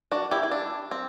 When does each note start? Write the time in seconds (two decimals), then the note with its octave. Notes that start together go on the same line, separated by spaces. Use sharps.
0.11 D4 F#4
0.31 E4 G4
0.43 E4
0.51 D4
0.91 C4